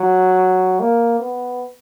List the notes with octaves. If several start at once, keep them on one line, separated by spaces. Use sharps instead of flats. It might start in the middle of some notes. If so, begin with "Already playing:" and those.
Already playing: F#3
A#3
B3